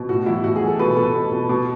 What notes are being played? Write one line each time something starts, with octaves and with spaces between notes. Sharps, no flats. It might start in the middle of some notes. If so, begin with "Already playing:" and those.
Already playing: B2
A2 F#4
E3 E4
A2 F#4
G#4
E3
A4
B2 B4
B2 A4
B2
B2
B2